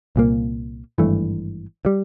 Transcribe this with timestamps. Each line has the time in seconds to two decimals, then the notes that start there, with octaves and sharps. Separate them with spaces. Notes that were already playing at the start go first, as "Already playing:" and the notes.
0.16 C2 A#2 F#3 A#3
0.98 G#1 G2 E3 A3
1.85 E3 G3